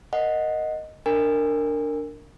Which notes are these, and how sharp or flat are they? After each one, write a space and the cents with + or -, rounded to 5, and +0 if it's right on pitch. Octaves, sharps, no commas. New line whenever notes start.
A#4 +0 D#5 +0 F#5 -10
D4 +0 A#4 -15 G#5 -40